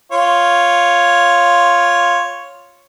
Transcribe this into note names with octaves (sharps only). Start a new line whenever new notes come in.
F4 C#5